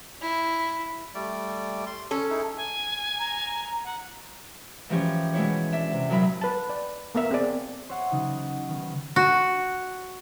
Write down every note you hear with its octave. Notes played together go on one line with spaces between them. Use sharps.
E4
G3 A3 D5
C6
C#4 A4 C#5
D#4 E4 G#4
G#5
A#5
F#5
G#2 E3 F3 C#4 G4 C#5
B2 G#3 C#4 E4 C#5
D4 E5
C3
F#2 A#2 F#3 E4 A#4 B5
B4 A5
D5
A#3 B3 A#4 E5
C4 G#4 D5
C5 C#5 E5 F#5
C#3 F#3 D#4
D#3 B3
F#4